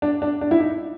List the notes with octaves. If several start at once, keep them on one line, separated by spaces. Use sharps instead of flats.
D4
D4
D4
E4
D#4